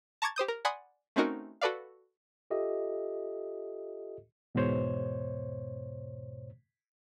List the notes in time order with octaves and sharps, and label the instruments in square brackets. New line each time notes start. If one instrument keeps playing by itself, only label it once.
[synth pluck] A5 A#5 C#6 D6 G#6 A6
G4 C5 D#6 G6
A#4
D5 F#5 G#5 B5 C6 D#6
A3 C4 C#4 D#4 F#4 A#4
F#4 A4 B4 D5 F5
[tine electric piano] F4 G4 A4 D#5 E5
[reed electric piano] E2 G#2 B2 C5 C#5